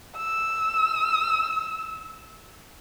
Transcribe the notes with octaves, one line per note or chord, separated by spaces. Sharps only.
E6